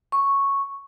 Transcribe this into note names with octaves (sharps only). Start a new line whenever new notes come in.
C#6